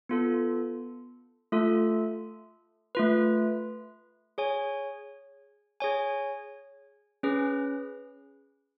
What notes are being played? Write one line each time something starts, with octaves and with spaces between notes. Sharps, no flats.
B3 F4 A4
A3 F4 A4
A3 F4 B4
G#4 C#5 G#5
G#4 C#5 G#5
C#4 G#4 B4